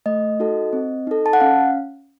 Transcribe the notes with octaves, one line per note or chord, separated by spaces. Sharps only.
A3 D#5
D#4 F#4 A4
C4
D#4 A4
A5
F#5
C#4 F5